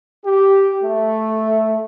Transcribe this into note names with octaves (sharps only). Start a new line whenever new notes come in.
G4
A3